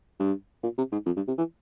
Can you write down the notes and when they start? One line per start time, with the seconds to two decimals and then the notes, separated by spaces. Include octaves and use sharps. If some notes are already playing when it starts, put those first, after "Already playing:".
0.20 G2
0.63 A#2
0.78 C3
0.92 G#2
1.06 F2
1.16 G2
1.28 C3
1.38 E3